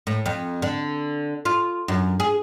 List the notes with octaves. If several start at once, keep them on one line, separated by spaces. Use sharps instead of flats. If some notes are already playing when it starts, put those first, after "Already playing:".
A2
F2
D3
F4
F#2
G#4